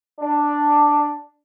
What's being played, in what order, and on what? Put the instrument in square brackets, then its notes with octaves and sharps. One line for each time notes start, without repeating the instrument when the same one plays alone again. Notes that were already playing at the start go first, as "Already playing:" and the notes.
[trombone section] D4